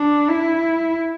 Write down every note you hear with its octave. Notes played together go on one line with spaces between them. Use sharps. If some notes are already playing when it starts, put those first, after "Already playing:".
Already playing: D4
E4